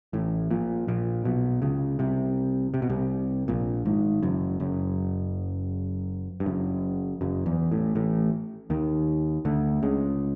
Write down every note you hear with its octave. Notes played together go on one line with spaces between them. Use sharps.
A1 A2
A#1 A#2
A#1 A#2
B1 B2
C#2 C#3
C2 C3
C3
B2
C2 C3
A#1 A#2
G#1 G#2
F#1 F#2
F#1 F#2
G2
F#1 F#2
F#1 F#2
E2
A1 A2
A1 A2
D#2 D#3
D2 D3
C#2 C#3